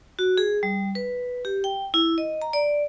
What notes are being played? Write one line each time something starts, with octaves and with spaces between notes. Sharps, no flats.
F#4
G#4
G3
B4
G4
G5
E4
D#5
A#5
D5